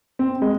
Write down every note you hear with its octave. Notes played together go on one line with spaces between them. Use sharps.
C4
G#3